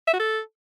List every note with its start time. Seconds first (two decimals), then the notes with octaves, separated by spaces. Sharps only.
0.07 E5
0.14 F#4
0.20 A4